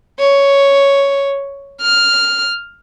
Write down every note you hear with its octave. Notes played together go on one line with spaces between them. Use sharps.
C#5
F6